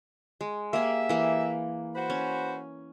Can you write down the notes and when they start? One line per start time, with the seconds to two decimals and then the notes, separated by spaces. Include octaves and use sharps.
0.41 G#3
0.73 A#3 G4 G#4 E5
1.09 E3 A#3
1.96 F#4 B4 C5
2.10 C#4